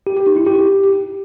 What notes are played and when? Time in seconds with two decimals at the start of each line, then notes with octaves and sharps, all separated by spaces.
0.07 G4
0.17 G4
0.27 D#4
0.37 E4
0.47 G4